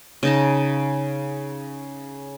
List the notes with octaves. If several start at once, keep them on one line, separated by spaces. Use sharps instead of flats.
C#3 D#4 A5